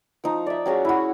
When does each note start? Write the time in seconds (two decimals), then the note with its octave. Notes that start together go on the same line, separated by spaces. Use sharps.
0.24 F3 D#4
0.46 D5 E5
0.66 F#3 C#4 F#4 G#4
0.85 E4 F#4